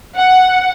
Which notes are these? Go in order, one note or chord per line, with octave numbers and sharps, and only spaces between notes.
F#5